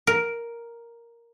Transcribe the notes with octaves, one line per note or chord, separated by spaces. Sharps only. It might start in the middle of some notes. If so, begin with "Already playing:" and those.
A#4